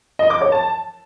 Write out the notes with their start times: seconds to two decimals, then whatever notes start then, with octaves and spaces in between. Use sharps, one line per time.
0.19 D#5
0.30 D6
0.41 C#5
0.52 A5